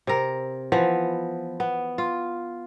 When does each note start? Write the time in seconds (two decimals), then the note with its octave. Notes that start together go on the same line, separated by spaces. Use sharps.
0.07 C3 A#4
0.72 E3 F3 B3
1.60 B3
1.98 F4